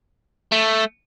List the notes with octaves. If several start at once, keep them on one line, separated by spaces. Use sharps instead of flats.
A3